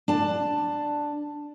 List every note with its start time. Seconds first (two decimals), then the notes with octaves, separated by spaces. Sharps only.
0.08 D4 A5